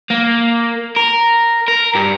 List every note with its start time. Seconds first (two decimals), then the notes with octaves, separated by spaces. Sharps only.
0.10 A#3
0.96 A#4
1.68 A#4
1.95 G2